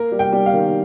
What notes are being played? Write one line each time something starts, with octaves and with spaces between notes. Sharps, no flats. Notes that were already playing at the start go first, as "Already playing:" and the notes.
Already playing: A#3 A#4
G3
G5
G3
F5
D#3